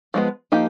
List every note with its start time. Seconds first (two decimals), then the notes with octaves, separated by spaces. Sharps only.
0.14 F3 G#3 B3
0.52 F3 A#3 D#4 G4